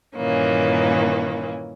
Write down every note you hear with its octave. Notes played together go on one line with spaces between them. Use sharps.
G2 A#2 D#3 E3 A#3 C#4